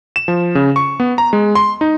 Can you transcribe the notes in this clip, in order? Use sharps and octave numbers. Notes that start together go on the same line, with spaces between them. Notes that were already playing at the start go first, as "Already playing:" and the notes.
E7
F3
C#3
C#6
B3
A#5
G#3
C6
D#4